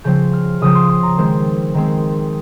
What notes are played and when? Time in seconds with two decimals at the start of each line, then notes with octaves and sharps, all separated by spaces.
0.04 C#3 F3 C4 G6
0.33 F6
0.61 C#3 F3 C4 D#6
0.75 C6
0.89 C6
1.03 A#5
1.17 D#3 G#3 C4 C5
1.74 D#3 G#3 C4